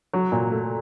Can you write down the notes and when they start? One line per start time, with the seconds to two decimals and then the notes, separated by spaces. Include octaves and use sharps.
0.13 F#3
0.32 A#2
0.51 A3